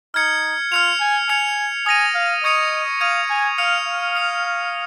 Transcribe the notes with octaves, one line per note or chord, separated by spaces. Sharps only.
D#4 F6 G#6 C#7
F4 F6 C#7 F7
G#5
G#5 F6 C#7 F7
G#5 D#6 A#6 D#7
F5
D#5 C#6 G#6 C#7 F7
F5 D#6 G#6 D#7
G#5
F5 F6 C#7 F7
F5
D#6 C#7 F7